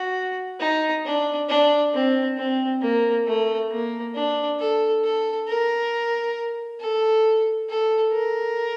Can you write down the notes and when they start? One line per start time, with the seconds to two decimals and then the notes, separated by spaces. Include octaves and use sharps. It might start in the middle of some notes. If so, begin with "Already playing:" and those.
Already playing: F#4
0.60 D#4
1.05 D4
1.49 D4
1.93 C4
2.37 C4
2.82 A#3
3.26 A3
3.71 A#3
4.14 D4
4.59 A4
5.04 A4
5.47 A#4
6.80 A4
7.69 A4
8.13 A#4